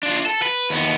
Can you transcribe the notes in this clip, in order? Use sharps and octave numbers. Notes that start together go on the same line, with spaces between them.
D4 F4
A4
B4
D#2 B3